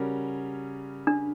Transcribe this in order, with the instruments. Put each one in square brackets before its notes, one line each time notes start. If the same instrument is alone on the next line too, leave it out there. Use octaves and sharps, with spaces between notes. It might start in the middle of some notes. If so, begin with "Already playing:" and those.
Already playing: [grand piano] C#3 G3 C#4 F#4 A#4
[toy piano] D4